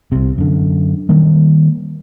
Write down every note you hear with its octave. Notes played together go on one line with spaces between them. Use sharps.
C2 C3
F#2 D3
D#3 G3 A#3